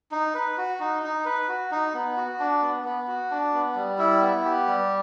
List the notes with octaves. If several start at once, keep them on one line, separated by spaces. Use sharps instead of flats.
D#4
B4
F#4
D#4
D#4
B4
F#4
D#4
B3
F#4
D4
B3
B3
F#4
D4
B3
G3
E4
B3
G4
G3